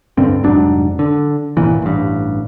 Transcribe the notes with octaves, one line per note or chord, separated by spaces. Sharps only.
D1 G2 D3 C4
F1 G#2 F#3 D4
D3
G1 C2 A#2 E3
A1 G2